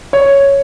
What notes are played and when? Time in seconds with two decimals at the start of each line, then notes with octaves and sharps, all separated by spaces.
0.13 C#5